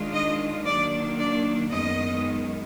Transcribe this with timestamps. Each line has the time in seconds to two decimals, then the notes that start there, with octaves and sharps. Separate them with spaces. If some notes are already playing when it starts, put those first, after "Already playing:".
Already playing: D#3 G#3 D4 F4
0.12 D#5
0.65 D#3 F#3 A#3 D4 D5
1.18 D5
1.70 F#2 D#3 G#3 B3 D#5